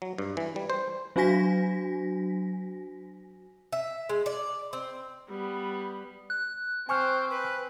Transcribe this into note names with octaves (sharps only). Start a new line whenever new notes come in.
F#3
G2
E3
G3
C5
F#3 D4 F#4 G#5 A#6 B6
E5
G#3
D5
C4
G3 B3
F#6
C4 C5 G#5 C#6 F6
B4